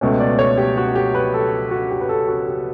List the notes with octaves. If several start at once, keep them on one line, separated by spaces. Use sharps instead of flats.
C#2 B2 A3 C#4
D5
C#5
G4
F#4
G4
B4
A4
F#4
G4
B4
A4
F#4
G4